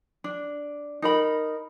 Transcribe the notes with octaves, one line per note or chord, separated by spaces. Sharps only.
D4
D#4 A#4 B5